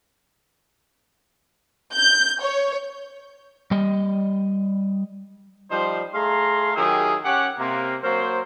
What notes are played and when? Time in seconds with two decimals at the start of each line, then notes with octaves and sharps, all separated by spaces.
1.94 G6
2.41 C#5
3.71 G3 D#5
5.71 F3 G3 D#4 C5
6.14 A3 G#4 F5 A#5 C6
6.76 D#3 F#3 E4 G4 G#4
7.25 C#4 G4 F#5
7.59 C3 A#3
8.03 F#3 A#3 A#4 C5